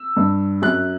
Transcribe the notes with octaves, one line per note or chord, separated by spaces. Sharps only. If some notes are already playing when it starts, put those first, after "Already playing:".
Already playing: E6
G2
F#2 F#6